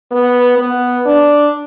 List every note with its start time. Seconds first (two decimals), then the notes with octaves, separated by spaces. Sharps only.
0.11 B3
0.58 B3
1.06 D4